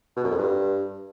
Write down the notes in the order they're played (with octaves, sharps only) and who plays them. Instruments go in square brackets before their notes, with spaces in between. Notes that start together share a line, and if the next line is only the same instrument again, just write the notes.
[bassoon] B2
F#2
F2
G2